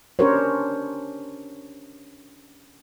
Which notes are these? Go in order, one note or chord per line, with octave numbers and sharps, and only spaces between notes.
C#4 D4 G4 A#4 C5 C#5